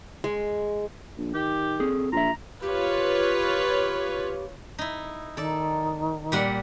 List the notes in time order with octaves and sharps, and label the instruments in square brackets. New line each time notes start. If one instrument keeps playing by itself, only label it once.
[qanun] G#3
[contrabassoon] A#1
[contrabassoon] D#3 [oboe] G4
[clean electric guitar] C4 G#4 A4
[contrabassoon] A#1 [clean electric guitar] F4 E5 [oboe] A#5
[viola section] F4 B4 C#5 [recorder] G4
[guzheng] D#4 E4
[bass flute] D#3 [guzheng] A4 D5
[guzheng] A#2 G3 F#5